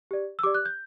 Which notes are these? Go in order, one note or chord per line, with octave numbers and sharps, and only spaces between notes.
G4 D5
E6
G4 D5 D6
F#6
G6